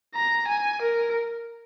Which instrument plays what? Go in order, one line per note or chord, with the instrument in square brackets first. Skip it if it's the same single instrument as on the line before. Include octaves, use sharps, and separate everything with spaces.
[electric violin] A#5
G#5
A#4